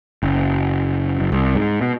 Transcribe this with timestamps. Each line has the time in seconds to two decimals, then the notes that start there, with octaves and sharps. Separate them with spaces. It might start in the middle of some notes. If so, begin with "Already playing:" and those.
0.23 F#1
1.20 F#1
1.32 C2
1.55 G#2
1.81 B2